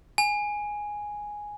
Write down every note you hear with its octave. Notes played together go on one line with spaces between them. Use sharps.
G#5